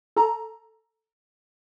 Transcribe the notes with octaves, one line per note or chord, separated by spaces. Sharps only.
A4 A#5